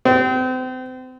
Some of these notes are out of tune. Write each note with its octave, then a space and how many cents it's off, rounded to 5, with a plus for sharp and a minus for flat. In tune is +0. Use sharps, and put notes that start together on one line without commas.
C4 -35